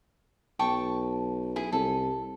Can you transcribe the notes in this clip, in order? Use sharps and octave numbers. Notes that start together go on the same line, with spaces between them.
B1 G5 A5 C#6
E4 G#4
C2 A4